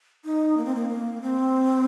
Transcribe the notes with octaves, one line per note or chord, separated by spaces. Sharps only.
D#4
A#3
C4
A#3
A#3
C4